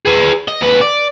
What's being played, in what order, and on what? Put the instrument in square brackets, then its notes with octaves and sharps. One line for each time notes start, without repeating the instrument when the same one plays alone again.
[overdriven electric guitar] G#4 B4
D#5
D#2 B4
D5